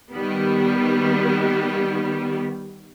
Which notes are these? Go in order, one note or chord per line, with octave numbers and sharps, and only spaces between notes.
D#3 G3 B3